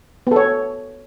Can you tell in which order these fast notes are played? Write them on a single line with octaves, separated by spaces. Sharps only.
B3 A4 C#5